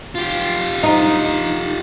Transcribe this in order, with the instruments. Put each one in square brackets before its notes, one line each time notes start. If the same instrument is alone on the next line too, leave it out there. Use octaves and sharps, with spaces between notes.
[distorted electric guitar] F4 G4
[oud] D#4